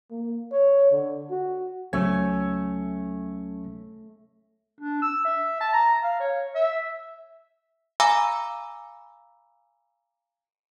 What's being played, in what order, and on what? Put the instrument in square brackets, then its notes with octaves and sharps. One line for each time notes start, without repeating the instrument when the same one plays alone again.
[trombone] A#3
C#5
D3
F#4
[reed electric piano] C#2 F#3 G#6 [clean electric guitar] A3 [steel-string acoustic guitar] C#4
[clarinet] D4
E6
E5
A5
A#5
F5
C#5
E5
[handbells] F5 G#5 A#5 B5 D6 E6